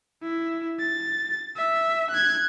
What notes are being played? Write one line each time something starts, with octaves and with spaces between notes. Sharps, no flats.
E4
A6
E5
F#6 G#6